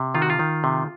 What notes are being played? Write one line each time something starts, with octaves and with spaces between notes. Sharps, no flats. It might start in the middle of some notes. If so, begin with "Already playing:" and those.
Already playing: C3
D#3 F4
F#4
F4
D#3
C3